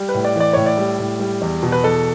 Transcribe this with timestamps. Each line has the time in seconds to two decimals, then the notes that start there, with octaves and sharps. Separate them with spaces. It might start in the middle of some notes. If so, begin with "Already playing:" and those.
Already playing: G3
0.09 B4
0.14 A2
0.25 D5
0.36 E3 D5
0.53 A2 C#5
0.66 D5
0.77 G3
0.99 A2
1.20 G3
1.41 E2
1.63 B2
1.72 B4
1.83 E2 A4